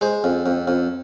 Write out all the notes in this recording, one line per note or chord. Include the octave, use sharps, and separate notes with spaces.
G#3 C5
F2
F2
F2